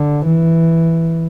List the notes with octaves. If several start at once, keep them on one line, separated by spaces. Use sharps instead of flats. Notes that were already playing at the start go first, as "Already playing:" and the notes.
Already playing: D3
E3